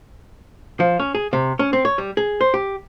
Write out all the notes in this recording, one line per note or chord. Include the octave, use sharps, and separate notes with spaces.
F3
C#4
G#4
C3
C#4
C4
C#5
G3
G#4
C5
G4